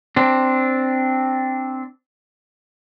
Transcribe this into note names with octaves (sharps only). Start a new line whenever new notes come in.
C4 D4